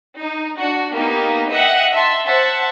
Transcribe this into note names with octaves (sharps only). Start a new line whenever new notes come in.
D#4
D4 F#4
A#3 B3 D#4 G4
D#5 E5 F#5 G5
E5 A5 C6
C5 E5 F#5 A5